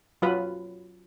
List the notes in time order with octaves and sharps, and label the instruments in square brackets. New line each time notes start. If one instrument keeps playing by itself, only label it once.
[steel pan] F#3 F4 B4